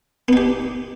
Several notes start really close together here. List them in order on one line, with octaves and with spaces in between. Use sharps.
B3 D#4 G4